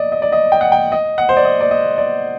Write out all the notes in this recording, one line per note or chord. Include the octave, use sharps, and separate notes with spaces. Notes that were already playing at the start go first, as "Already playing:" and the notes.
Already playing: D5 D#5
D#5
D5
D#5
G5
F#5
G5
D#5
F#5
C5
D5
D#5
D5
D#5
D5